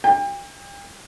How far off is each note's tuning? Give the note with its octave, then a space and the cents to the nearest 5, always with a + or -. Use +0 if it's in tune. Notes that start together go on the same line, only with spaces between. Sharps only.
G5 +35